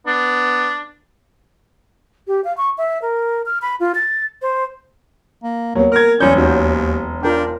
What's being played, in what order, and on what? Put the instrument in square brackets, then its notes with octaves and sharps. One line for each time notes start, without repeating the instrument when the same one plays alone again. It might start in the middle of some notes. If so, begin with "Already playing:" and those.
[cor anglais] B3 [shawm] D4
[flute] G4
F5
C#6
E5
A#4
F6
B5
F4
A6
C5
[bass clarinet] A#3
[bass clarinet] D#2 [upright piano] F#3 [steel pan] A#3 B3
[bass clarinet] A#4 [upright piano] F6 G#6
[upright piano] E1 F#3 G6 [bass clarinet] C#4 [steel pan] D5
[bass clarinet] D#2 [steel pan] C#4 D#4 F#4
[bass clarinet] D4 [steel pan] F4 A#4 G5